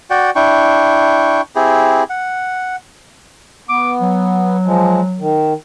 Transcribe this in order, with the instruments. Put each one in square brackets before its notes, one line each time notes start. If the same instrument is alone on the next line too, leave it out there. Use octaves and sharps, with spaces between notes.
[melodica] F#4 D5 F#5 G5
D4 E4 G5 C#6
C4 E4 G4 G#4
F#5
[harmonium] B3 [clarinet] D6
[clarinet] F#3
[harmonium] F3 G#3
D#3